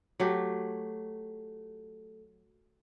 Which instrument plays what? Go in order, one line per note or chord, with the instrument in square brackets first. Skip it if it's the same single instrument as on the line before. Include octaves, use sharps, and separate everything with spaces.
[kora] F#3 A3 G4